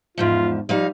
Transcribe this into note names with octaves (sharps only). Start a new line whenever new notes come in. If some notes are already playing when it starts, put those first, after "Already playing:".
E2 G#2 F3 F4
F3 G3 D#4 F5